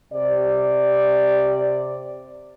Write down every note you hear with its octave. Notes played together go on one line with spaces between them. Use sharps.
C3 G4 D5